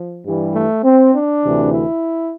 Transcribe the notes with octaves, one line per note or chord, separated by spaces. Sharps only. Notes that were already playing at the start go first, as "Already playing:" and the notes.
Already playing: F3
G2 E3 G3
A3
C4
D4
D2 C3 E3
E4